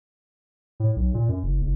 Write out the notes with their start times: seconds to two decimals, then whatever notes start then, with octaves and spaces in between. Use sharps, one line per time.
0.80 A2
0.96 B1
1.14 A#2
1.29 F#2
1.43 F#1
1.62 F#1